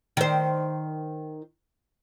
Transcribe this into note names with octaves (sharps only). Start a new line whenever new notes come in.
D#3 C5